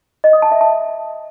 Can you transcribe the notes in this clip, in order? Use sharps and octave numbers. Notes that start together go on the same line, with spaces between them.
D#5
D#6
A5
E5
A5